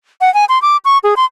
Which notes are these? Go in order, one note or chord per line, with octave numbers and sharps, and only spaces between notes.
F#5
G#5
C6
D6
C#6
G#4
C6